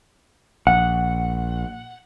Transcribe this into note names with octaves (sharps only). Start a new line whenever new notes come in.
A#1 F#5